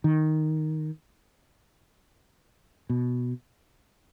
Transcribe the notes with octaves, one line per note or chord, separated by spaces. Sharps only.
D#3
B2